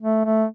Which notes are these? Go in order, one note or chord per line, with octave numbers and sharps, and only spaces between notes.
A3
A3